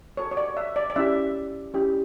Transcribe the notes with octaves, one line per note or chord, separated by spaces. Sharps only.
F#4 A4 C#5
C#5
D5
E5
D5
D5
C#4 E4 G4 E5
C#4 E4 G4